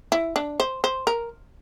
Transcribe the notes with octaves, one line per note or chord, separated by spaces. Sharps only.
E4
D4
C5
C5
A#4